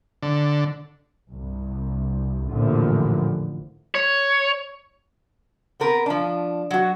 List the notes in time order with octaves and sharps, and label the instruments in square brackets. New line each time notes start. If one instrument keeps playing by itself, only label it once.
[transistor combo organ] D3
[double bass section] C2 G2
A1 F2 A#2 D3 E3 F3
[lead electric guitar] C#5
[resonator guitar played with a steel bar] B3 C4 A#4 B4
F3 D4
F#3 F#4